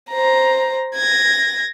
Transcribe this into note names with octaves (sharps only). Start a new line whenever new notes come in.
C5 A#5
G#6 A#6